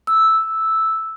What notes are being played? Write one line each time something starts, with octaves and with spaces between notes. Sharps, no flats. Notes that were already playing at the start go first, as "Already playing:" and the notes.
E6